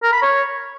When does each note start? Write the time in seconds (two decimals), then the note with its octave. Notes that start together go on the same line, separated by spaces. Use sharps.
0.03 A#4
0.13 B5
0.22 C#5